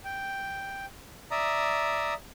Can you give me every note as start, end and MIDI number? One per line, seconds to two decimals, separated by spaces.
0.05 0.86 79
1.31 2.14 74
1.31 2.14 76
1.31 2.14 82
1.31 2.14 87